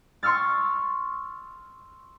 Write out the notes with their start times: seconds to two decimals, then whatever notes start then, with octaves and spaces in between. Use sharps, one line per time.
0.23 C6 C#6 E6 F6 A6